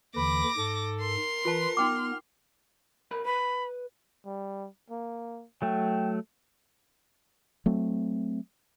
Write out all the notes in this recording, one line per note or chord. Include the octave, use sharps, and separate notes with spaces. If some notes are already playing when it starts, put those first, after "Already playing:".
D#2 D3 E3 B5 D6 A#6
G#2 A4
A#4 C6
E3 F4 B4 A5
B3 D#4 G5 D6 F6
B1 A#4 B5
B4 B5
G3
A#3
F#3 A3 G5
F#3 A3 C4